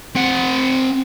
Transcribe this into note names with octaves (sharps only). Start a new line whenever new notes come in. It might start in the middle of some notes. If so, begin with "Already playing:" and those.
C4 F#5